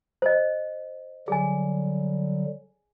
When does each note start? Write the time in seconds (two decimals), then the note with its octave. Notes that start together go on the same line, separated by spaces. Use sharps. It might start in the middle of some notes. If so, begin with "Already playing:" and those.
0.22 C5 D#5
1.28 D3 F#3 G3 G#4 G#5